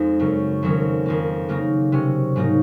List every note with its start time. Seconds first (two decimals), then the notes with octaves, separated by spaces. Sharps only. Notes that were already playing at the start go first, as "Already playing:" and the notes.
Already playing: F2 G#3 D#4
0.19 F#2 C#3 F#3
0.62 F2 D#3 F#3 C#4
1.06 F2 D#3 A#3
1.49 C#3 F#3 A#3 D#4
1.92 C3 F#3 C#4
2.36 G#2 F#3 A#3 D#4